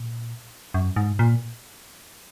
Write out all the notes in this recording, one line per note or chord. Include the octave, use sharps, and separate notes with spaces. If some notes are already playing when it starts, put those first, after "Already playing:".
Already playing: A#2
F#2
G#2
A#2